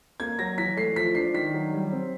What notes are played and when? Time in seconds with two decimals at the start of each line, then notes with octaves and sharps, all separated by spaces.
0.20 A#3 G#6
0.39 F#3 A#6
0.58 E3 B6
0.77 A3 C7
0.96 F3 B6
1.15 D4 C7
1.34 D#3 B6
1.54 F#3
1.73 G3
1.92 C4